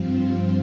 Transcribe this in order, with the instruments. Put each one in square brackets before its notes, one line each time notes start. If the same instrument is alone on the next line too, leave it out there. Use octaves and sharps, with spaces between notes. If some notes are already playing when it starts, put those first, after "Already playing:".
Already playing: [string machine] G2 F3 C4 F4